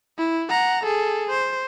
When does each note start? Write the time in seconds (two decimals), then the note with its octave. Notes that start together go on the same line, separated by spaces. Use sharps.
0.18 E4
0.49 F#5 A#5
0.83 G#4 A4
1.30 C5